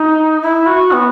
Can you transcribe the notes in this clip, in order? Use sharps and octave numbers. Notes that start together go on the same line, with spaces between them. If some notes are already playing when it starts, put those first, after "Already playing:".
Already playing: D#4
E4
F#4
B3